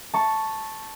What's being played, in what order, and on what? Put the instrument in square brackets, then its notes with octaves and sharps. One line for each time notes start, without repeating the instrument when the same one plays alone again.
[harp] A5 C#6